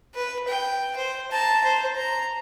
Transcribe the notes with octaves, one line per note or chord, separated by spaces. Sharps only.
B4
G5
C5
A5 A#5
C5
A#5